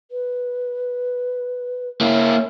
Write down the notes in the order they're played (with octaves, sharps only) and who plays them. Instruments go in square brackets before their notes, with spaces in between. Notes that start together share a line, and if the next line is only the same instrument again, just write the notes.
[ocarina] B4
[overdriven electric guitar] A#3 E4 [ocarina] C#5